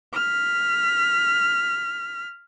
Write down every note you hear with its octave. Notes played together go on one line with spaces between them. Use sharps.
F6 B6